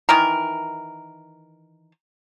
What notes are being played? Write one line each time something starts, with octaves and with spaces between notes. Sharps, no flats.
D#3 E3 D#4 A#4